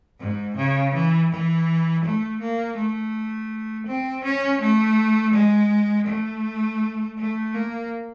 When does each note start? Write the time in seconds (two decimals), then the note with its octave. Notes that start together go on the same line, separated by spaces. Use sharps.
0.20 G#2
0.57 C#3
0.94 E3
1.31 E3
2.04 A3
2.41 A#3
2.78 A3
3.87 C4
4.24 C#4
4.61 A3
5.34 G#3
6.07 A3
7.19 A3
7.54 A#3